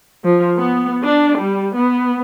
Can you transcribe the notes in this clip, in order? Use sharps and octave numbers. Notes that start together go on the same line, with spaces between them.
F3
B3
D4
G3
B3